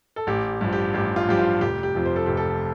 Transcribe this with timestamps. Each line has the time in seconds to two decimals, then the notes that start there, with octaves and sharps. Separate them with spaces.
0.16 A4
0.27 A1 G4
0.61 G2 F3
0.73 G4
0.94 A1 G4
1.16 F4
1.29 G2 F3 G4
1.39 F4
1.61 F1 G4
1.83 G4
1.96 F2 F3
2.06 C5
2.16 A4
2.26 F1 G4
2.37 A4